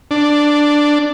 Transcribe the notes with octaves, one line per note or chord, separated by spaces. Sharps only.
D4